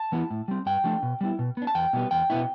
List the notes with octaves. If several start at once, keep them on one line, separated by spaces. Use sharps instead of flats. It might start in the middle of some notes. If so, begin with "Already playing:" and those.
Already playing: A5
E3 B3 E4
A2
G3 C4
G2 G5
F3 A3 D4
B2
G3 B3 E4
B2
B3 D4
A5
E2 G5
B2 G3 B3
E2 G5
B2 B3 E4